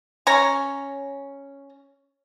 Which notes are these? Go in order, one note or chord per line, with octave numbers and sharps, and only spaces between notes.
C#4 C#5 A#5